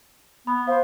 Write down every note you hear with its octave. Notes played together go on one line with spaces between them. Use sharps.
B3 B5
C5 F5